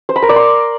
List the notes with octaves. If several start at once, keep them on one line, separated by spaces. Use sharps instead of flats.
C5
B5
A#4
D5
C6